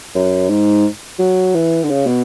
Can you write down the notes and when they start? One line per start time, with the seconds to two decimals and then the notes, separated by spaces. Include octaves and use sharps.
0.15 F#2
0.50 G#2
1.19 F#3
1.54 E3
1.84 D3
1.90 C#3
2.06 B2